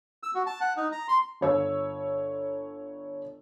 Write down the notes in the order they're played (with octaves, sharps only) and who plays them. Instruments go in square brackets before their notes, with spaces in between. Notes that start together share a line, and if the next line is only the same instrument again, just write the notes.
[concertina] E6
F#4
A5
F#5
D#4
A#5
C6
[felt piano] G1 C#5 E6